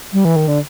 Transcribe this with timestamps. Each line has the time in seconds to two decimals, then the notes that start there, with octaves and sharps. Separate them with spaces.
0.13 G3
0.25 E3
0.36 D#3
0.48 D3